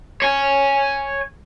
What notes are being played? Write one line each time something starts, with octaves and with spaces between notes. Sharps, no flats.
C#5 G#5